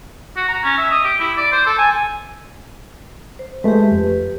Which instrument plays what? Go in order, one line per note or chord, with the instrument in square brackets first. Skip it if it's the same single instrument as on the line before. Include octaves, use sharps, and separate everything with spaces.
[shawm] F#4
A#5
C#4
E5
D#5
G4
E4
D5
C5
A4
G#5
[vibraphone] C5
[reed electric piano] G#3 A3 [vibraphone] G4 B4
[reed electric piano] F2